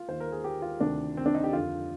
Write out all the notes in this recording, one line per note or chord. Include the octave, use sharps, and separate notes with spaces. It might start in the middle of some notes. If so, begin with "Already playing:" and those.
Already playing: F4
D#2 D#3 C5
A#4
G#4
G4
F4
D2 C3 D#3 D4
C4
D4
D#4
G4
F2 D3 F4